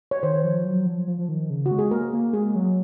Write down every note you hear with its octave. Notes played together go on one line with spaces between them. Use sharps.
C#5
D#3 C5
F3
F#3
F3
F3
F3
D#3
C#3
F#4
G#3
G#4
A#3 A#4
A#3
G#3 G#4
F#3